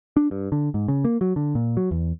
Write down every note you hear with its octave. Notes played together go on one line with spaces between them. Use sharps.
D4
G2
D3
G#2
C#3
A#3
F#3
D3
A#2
F#3
E2